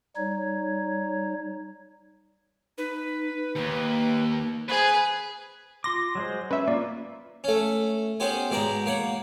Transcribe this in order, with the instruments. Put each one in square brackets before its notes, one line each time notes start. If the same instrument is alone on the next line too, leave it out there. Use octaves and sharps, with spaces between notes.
[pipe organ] G3 D#4 C#5
[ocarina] D#4 [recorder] B4
[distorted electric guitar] D#2 [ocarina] A#3
[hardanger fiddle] G#4 [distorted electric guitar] B4 [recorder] C5
[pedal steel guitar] F4 C6 D6 [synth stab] A#6
[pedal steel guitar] F#3 G#3 C5
[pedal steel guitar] C#4 [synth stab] B4 E5
[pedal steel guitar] A#3 F4 [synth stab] D5
[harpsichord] A3 C#4
B3 C#4 G4 C5 G#5
G#2 B2 D5 G5 A#5
A#3 C#5 F#5